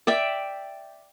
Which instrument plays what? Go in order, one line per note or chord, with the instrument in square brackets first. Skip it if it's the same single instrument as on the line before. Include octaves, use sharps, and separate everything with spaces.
[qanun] D5 E5 G5